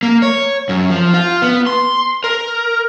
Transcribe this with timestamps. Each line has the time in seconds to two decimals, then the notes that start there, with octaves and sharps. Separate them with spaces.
0.03 A#3
0.22 C#5
0.69 F#2
0.90 F3
1.14 F4
1.42 B3
1.67 C6
2.24 A#4